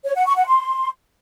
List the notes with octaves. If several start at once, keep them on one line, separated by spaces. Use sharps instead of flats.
C#5
F#5
C#6
F#5
C6